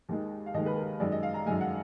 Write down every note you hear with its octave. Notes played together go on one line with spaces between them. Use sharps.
D#2 D#3 G#3
F5
D#2 D#3 G#3 D#5
B4
A#4
F#2 D#3 G#3 D5
D#5
F5
A#5
F#2 D#3 G#3 G#5
F#5